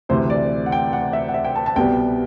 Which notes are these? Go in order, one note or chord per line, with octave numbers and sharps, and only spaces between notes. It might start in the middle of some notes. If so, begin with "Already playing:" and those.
D2 C3 E3 C5
D5
F#5
G5
F#5
E5
F#5
E5
G5
A5
A5
C2 B2 G3 B3 G5